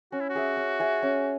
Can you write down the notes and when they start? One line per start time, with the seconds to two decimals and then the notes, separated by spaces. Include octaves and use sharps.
0.12 C#4 F#4
0.20 E4
0.30 F#4
0.35 G#4 E5
0.57 C#4
0.80 G#4 E5
1.03 C#4